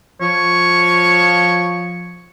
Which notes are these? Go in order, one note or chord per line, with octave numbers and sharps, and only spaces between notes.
F3 C#5